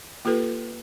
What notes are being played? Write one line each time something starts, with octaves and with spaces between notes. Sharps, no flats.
A#3 F4 G4 A4 B4